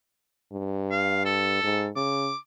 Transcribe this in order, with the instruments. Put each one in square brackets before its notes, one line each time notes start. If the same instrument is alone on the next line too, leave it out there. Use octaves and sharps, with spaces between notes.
[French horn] G2
[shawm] F5
A4
[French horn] G#2
[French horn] C#3 [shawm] D6